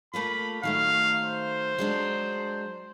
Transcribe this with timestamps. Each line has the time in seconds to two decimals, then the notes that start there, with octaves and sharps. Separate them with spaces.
0.14 A3 A#3 F4 B5
0.63 D#3 F#3 A3 F5
1.23 C5
1.78 F#3 G#3 D4